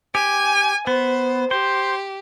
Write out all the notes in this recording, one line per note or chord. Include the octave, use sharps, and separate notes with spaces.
G4 G#5
B3 C5
G4 C5